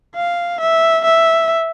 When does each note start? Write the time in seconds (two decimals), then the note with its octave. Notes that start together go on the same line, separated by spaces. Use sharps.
0.15 F5
0.60 E5
1.05 E5